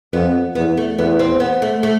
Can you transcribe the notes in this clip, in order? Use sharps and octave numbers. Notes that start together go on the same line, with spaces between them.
F2 B3
E2 B3
A3
E2 B3
C4
B3
A3
A3